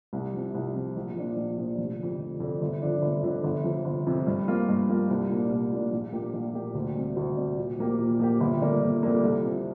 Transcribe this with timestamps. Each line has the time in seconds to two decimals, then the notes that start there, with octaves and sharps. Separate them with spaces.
0.13 C2
0.34 C3 F3
0.54 C2
0.75 C3 F3
0.96 A#1
1.16 A#2 F3 D4
1.37 A#1
1.58 A#2 F3 D4
1.78 F1
2.00 F2 D3
2.19 F1
2.40 F2 D3
2.62 G1
2.82 F2 D3 F3 D4
3.02 G1
3.23 F2 D3 F3 D4
3.44 G1
3.64 F2 C3 F3
3.85 G1
4.06 F2 C3 F3
4.27 G2
4.48 F3 A#3 F4
4.69 G2
4.89 F3 A#3 F4
5.09 C2
5.29 A#2 A#3 D4
5.50 C2
5.72 A#2 A#3 D4
5.92 A#1
6.13 A#2 A#3 G4
6.34 A#1
6.54 A#2 A#3 G4
6.75 D2
6.95 C3 G3
7.16 D2
7.37 C3 G3
7.58 A#2
7.79 F3 A#3 G4
7.99 A#2
8.19 F3 A#3 G4
8.41 G1
8.61 F2 D3 G3 A#3
8.82 G1
9.03 F2 D3 G3 A#3
9.23 C2
9.44 C3 F3